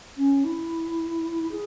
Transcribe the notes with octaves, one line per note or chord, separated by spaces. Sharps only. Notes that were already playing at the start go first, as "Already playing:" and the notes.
C#4
E4
G#4